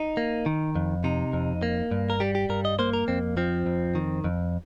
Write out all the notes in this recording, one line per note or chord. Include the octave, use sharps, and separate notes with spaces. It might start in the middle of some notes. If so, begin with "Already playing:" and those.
Already playing: D#4
A#3
D#3
F2
C3 D#4
F2
A#3
G2
A#4
G3 G4
G4
G2 A#4
D#5
A#3 C5
A#4
F2 C4
F3 C4
F2
D#3
F2